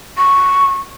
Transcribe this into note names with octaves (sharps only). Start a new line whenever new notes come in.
C#6